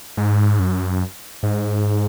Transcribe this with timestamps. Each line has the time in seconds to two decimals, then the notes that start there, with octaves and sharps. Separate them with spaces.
0.17 G#2
0.59 F#2
1.43 G#2